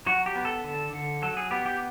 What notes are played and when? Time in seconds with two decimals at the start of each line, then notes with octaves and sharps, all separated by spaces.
0.06 F#3 F#4
0.26 G4
0.36 B3
0.45 A4
0.64 D3
0.93 D3
1.22 F#3 A4
1.37 G#4
1.51 B3 G4
1.66 G4